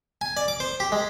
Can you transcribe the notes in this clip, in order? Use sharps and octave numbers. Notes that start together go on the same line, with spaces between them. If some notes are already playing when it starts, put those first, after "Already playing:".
G#5
D5
D6
C5
G4
G#3